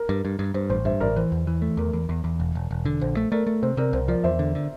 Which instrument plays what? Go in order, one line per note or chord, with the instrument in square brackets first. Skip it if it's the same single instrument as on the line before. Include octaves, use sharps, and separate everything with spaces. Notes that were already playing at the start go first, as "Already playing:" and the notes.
Already playing: [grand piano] A#4
[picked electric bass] G2
G2
G2
[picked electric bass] G2 [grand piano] C5
[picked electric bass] A1 [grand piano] C5
[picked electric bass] G2 [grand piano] C5 E5
[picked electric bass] A1 [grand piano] A#4 D5
[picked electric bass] E3 [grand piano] C5
[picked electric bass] E2
E3
A3
[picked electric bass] E2 [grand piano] A#4
[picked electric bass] E2
E2
E2
E1
E1
E1
D3
[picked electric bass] A#1 [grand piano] C5
[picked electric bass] A3
[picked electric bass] A3 [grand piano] A#4 D5
[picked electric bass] A3
[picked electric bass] C3 [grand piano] C5
[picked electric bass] C3 [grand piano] A#4 D5
[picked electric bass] C2 [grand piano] C5
[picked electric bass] F3 [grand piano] A#4 D5
[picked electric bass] E2 [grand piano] C5 E5
[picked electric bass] D3
D3